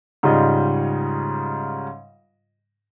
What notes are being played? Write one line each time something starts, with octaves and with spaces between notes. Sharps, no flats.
G#2 C#3 G3 F4 D#5